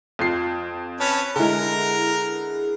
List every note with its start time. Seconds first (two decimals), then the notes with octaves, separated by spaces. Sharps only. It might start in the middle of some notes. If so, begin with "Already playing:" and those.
0.19 F2 F4 C7
1.00 C#4 B4 A5
1.36 D3 G#3 E4 G#4 A#4